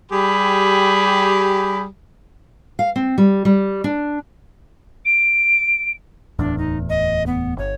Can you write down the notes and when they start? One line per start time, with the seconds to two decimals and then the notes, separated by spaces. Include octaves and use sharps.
0.11 G3 G4 G#4 B5
2.79 F5
2.96 C4
3.18 G3
3.45 G3
3.84 D4
5.05 D7
6.39 D1 E2 A2 D4
6.58 D#4
6.90 D#5
7.26 B3
7.58 G1 C#5